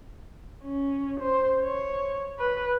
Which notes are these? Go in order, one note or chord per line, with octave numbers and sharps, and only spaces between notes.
C#4
C5
C#5
B4